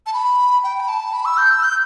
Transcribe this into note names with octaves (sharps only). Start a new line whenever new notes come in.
A5
B5
G5
B5
A5
B5
E6
G6
E6
G6